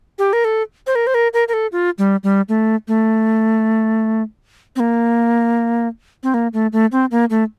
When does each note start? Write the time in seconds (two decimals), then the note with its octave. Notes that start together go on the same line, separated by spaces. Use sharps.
0.19 G4
0.33 A#4
0.45 A4
0.87 C5
0.95 A#4
1.07 C5
1.14 A#4
1.34 A#4
1.48 A#4
1.53 A4
1.72 F4
1.98 G3
2.24 G3
2.49 A3
2.88 A3
4.76 C4
4.80 A#3
6.23 C4
6.34 A#3
6.53 A3
6.73 A3
6.92 C4
7.11 A#3
7.30 A3